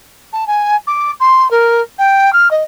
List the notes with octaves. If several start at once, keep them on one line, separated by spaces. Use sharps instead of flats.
A5
G#5
D6
C6
A#4
G5
F6
D#5